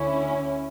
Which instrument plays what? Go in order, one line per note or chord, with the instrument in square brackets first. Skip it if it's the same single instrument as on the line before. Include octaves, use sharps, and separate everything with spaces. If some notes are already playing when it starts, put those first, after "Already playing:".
Already playing: [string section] D2 D3 C#4 E4